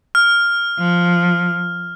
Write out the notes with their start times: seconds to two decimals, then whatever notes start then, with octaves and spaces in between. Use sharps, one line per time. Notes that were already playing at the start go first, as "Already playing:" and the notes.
0.15 F6
0.79 F3